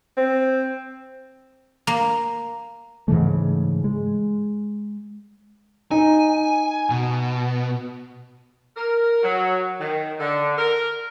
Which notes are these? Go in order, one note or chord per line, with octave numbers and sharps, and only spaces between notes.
C4
A#3
G#2 C#3 E3 A3
G#3
D#4 G#5
B2
A#4
F#3
D#3
D3
A#4